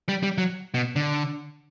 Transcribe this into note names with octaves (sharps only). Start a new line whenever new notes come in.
G3
G3
F#3
B2
D3